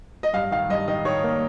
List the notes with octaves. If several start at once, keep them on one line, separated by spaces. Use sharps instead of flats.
D#5
G2 F5
D#3 F5
G2 D#5
D#3 D#5
D#3 C#5
A#3